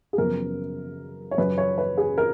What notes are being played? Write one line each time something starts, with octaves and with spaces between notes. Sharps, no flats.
G#4
F#2 C#3 F3 B3 A#4
C#5
F#2 C#3 F#3 C#4 B4
C#5
B4
G#4
A#4